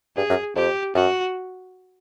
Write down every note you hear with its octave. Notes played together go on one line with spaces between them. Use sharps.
G2 G#4
F#2
F2 G4
F#2 F#4